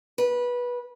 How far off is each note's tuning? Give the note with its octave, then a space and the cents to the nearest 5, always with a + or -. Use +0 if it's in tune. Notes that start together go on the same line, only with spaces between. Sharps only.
B4 -20